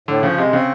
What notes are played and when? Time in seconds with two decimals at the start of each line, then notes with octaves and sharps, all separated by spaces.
0.08 A2 D3
0.23 C#3 F3
0.38 C3 G#3
0.53 C#3 C4